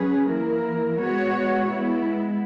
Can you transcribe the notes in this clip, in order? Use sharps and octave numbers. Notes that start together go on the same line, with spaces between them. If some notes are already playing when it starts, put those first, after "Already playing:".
Already playing: F#3 C#4 G#4 B4
E3 A#3 E4 A#4
G#3 B3 F#4 C#5
G#3 B3 E4